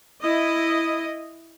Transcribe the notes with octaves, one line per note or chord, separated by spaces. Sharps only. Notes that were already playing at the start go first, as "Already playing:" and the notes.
E4 D#5